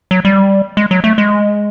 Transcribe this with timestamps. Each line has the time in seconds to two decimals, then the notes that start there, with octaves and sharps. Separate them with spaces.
0.11 F#3
0.25 G3
0.77 G#3
0.91 F#3
1.04 A3
1.18 G#3